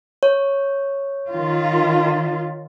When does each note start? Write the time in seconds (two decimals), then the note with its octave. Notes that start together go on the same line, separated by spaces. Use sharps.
0.23 C#5
1.32 D#3 F4